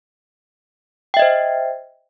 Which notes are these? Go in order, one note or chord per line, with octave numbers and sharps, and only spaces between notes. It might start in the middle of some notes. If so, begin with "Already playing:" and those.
C5 D#5 E5 G5